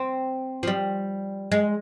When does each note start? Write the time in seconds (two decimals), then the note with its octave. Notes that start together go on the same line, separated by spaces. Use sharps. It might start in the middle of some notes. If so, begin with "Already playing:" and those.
Already playing: C4
0.63 F3
0.67 G3
1.52 G#3